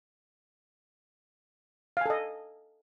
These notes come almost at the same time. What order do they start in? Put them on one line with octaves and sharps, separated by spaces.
F5 G#5 A4 D#5